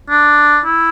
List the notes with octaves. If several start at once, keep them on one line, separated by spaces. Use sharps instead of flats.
D4
E4